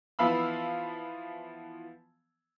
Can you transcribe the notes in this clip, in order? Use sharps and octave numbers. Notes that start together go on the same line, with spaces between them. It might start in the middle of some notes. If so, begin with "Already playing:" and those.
E3 F3 B3 F5 B5 E6